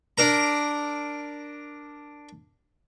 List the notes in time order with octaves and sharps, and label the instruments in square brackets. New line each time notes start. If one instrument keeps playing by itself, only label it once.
[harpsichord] D4 A#4 A#5